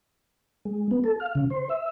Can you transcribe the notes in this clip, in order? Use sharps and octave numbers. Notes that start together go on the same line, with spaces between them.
G#3
B3
A4
F5
C#3
C5
E5